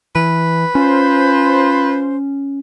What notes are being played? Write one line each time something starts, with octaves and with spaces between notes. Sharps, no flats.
E3 B4
C#4 F4 C5